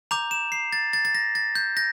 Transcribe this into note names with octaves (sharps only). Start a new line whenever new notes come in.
A#5 D6 G6 F7
E7
C7
A6
A6
A6
A#6
A6
G6
G6 A#6